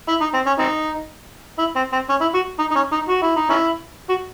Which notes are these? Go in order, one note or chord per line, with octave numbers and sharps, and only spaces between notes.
E4
D#4
C4
C#4
C4 D#4
E4
C4
C4
C#4
E4
F#4
D#4
D#4
C#4
D#4
F#4
E4
D#4
C#4 E4
F#4